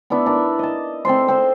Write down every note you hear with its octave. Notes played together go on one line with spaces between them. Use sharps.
B3 D4 E4
D4 A#4
D#5 A5
C4 A4 C5 C6
C4 C5